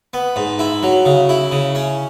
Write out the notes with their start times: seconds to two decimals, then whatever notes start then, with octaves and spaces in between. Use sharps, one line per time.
0.13 B3
0.36 G#2
0.59 E4
0.83 F#3
1.05 C#3
1.29 E4
1.52 C#3
1.75 C#4